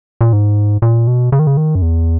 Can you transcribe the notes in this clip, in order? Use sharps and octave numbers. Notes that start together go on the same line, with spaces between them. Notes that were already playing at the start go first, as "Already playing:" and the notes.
A#2
G#2
A#2
B2
C#3
D#3
C#3
D#3
F#2
E2